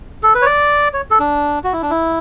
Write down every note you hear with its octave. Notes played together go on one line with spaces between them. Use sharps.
A4
B4
C#5
D5
C#5
A4
D4
F#4
E4
D4
E4